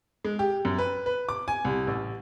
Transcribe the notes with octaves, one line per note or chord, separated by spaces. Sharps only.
G#3
G4
F#2
B4
B4
D6
G#5
C2
A1